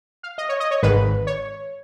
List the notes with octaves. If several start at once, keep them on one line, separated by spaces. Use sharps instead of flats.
F5
D#5
C#5
D#5
C#5
G#1 G#2 D#3 B4
C#5